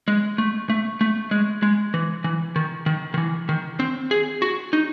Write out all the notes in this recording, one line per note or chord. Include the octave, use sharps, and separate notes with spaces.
G#3
A3
A3
A3
G#3
G#3
E3
E3
D#3
D#3
D#3
E3
D#3
C4
G#4
F#4
D#4